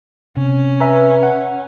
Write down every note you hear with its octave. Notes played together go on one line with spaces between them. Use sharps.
C3 C#4
B4 E5 G#5 A#5
F#5